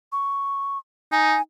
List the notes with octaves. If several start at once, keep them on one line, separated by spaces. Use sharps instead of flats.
C#6
D#4 G#5